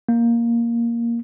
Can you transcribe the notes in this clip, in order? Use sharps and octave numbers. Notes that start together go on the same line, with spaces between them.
A#3